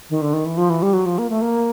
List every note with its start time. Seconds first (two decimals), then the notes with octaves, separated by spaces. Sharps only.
0.10 D#3
0.22 D3
0.33 D#3
0.46 E3
0.57 F3
0.70 E3
0.82 G3
0.93 F#3
1.06 F3
1.18 A#3
1.30 A3
1.42 A#3